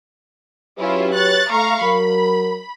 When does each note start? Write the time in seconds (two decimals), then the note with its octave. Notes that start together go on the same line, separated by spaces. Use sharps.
0.78 F#3 C#4 E4 F4 G4 B4
1.15 C#5 F#6 A6
1.50 A3 F5 A#5 C#6
1.82 F#3 A#4 B5